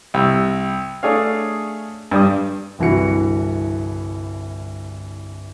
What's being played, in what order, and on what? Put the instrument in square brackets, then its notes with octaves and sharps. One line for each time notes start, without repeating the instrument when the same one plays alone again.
[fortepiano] C2 E6
A3 D4 G#4 A4 C#5 F5
G2 G3 D#6
[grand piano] G1 C2 E3 F#4 C#7